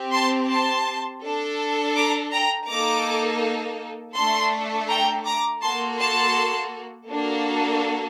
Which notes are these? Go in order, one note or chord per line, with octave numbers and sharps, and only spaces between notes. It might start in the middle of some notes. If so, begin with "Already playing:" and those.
Already playing: C4 G4
A5 C6
A5 C6
D4 A4
A#5 D6
G5 A#5
A#3 D#4 A4 A#5 D6
A3 D4 A4 A5 C6
G5 A#5
A#5 D6
A#3 F#4 A4 A5 C6
A5 C6
A#3 D4 F#4 A4